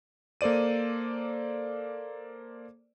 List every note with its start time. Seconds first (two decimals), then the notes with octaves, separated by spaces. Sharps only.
0.41 A#3 A4 C5 D5 D#7